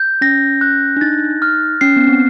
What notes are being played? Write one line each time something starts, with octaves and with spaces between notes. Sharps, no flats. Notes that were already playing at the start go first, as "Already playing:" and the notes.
Already playing: G6
C#4 A#6
F#6
D4
D#4 A6
F6
C#4 C7
B3
C4